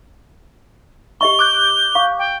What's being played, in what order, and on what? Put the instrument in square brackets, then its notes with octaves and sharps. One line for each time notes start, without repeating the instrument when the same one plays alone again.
[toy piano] G4 D#5 C#6 [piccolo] G7
[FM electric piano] D6 F#6 G6
[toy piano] F5 C#6
[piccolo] G5